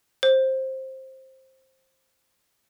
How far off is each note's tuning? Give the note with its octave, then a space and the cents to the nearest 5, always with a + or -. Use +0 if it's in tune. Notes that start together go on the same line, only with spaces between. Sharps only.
C5 +15